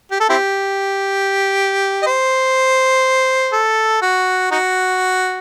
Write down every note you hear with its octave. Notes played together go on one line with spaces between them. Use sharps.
G4
A4
C4 E4 G4
D#5
C5
A4
F#4
D#4 F#4